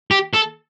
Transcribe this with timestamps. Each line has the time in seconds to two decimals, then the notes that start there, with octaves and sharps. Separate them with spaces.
0.11 G4
0.34 A4